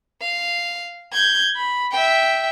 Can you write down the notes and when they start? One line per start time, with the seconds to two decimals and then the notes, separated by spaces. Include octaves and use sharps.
0.22 F5
1.13 G6 G#6
1.57 B5
1.92 E5 G5